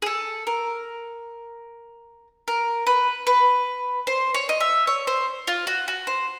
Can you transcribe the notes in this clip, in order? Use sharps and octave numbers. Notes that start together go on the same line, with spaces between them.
G#4
A4
A#4
A#4
B4
B4
C5
C#5
D#5
E5
C#5
C5
F4
F#4
F#4
C5